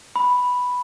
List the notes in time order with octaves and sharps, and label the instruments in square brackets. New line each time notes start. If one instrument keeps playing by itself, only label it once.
[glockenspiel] B5